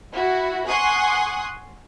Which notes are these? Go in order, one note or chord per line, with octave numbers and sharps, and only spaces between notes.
E4 F#4
F#5 G#5 C6 C#6 D#6 F#6